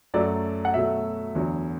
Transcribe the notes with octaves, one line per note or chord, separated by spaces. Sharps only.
F#2 F#3 A3 D5
F#5
B2 F#3 A3 E5
E2 D3 F#3